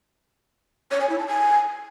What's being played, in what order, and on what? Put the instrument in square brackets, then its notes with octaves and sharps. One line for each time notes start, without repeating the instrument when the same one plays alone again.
[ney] C#5
G#5
E4
A5
G#5